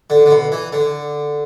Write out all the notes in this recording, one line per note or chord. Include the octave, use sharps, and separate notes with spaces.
D3
D3
B2
E3
D3